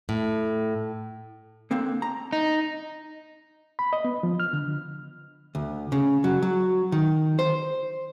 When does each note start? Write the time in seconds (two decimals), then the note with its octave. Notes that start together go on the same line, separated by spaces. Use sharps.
0.09 A2
1.71 D3 A#3 C4
2.02 A#5
2.32 D#4
3.79 B5
3.93 D#5
4.05 B3
4.23 F3
4.40 F6
4.53 D3
5.55 D2
5.92 C#3
6.24 F#3
6.42 F#3
6.92 D#3
7.39 C5